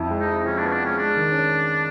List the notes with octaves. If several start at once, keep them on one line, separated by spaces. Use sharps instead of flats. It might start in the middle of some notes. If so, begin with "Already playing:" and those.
Already playing: F2 E4
G#3
D#4
E4
F3 C#4
D4
B3 C#4
D4
G#3 C#4
G#3 D4
D#3
C#4